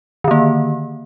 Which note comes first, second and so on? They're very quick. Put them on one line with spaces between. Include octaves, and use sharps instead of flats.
D#3 D3 A#3